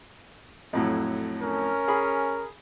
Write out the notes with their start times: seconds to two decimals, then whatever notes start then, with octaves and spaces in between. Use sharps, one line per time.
0.73 F2 A2 F#3
1.42 C#4 A#4
1.88 G#4 B5